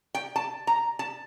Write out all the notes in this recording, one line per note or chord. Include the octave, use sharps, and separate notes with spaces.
G5
A5
A#5
A5